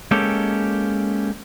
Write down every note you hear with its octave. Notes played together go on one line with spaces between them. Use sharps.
G#3 A#3 C#4 G4 A4 C#5